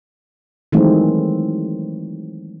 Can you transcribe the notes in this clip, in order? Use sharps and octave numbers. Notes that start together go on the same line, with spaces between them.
D#3 E3 F#3 G#3 A3 C4